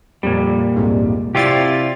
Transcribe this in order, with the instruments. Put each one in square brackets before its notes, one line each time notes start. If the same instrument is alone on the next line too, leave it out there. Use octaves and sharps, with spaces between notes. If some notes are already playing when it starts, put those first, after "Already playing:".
[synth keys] F2 [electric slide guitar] A#2 G3
[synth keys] C2 F2 G#2
[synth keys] C3 D5 A6 [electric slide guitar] E4 F4 G4